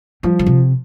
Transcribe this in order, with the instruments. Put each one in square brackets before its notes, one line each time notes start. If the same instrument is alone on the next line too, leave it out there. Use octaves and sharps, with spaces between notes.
[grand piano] F3 [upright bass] G3
[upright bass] D3
C3